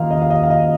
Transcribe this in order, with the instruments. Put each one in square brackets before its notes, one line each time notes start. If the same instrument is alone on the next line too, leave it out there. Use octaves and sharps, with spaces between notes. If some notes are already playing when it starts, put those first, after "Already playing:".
Already playing: [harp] D#3 A#3 F4 [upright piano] D#5 F5
[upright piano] D#5
F5
D#5
F5
D#5